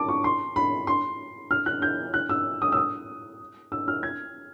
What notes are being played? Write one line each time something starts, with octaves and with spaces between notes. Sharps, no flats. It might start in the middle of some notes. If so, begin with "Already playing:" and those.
Already playing: A5 D6
C#6
C6
B5
C6
F6
F#6
G6
F#6
E6
D#6
E6
D#6
E6
F6
G#6